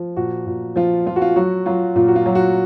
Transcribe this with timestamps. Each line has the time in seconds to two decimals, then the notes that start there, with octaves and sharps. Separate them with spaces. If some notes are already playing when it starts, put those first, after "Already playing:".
Already playing: F3
0.16 A#2 F#4
0.46 A#2
0.76 F3 F4
1.06 F3 F4
1.16 F#4
1.22 F4
1.36 F#3 F#4
1.66 F#3 F4
1.96 A#2 F4
2.08 F#4
2.16 F4
2.26 F#3
2.35 F#4